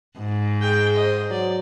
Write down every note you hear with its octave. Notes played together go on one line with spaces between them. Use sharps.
G#2
G#3 G#4 G5
C5 D#5
F#3 D5